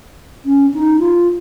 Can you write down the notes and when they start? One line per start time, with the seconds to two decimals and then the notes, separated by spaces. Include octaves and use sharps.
0.45 C#4
0.74 D#4
0.99 F4